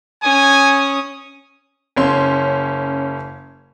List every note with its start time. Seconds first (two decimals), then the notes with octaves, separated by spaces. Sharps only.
0.23 C#4 G#5 D#6
1.96 F#1 C#4 C6